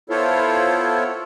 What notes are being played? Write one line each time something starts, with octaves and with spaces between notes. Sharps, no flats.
B3 E4 F4 A4 C5 C#5